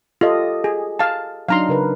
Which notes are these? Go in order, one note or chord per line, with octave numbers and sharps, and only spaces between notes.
F4 G4 A4 D#5
G#4
F5 A5
F#3 D4 D#4 F5 A#5 C6
C#3 A#4 B4